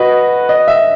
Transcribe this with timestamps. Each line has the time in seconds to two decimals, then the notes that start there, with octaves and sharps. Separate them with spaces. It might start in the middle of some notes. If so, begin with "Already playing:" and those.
Already playing: F#4 B4 D#5
0.49 D#5
0.68 E5